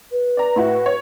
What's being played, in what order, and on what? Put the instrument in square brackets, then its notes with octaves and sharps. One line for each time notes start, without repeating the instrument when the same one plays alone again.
[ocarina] B4
[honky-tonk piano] D5 A#5
A2 E4 F#4
C#5